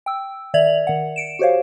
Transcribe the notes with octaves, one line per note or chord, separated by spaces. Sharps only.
G5 E6
D#3 D5 E5 G#6 F7 F#7
D#3 F#5
C#7 D7 E7
F#4 G4 C5 C#5 F5